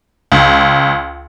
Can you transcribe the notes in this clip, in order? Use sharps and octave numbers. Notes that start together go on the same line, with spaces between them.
C#2